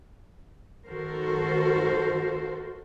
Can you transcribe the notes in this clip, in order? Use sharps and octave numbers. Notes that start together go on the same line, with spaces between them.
D#3 F#4 A4 A#4 C5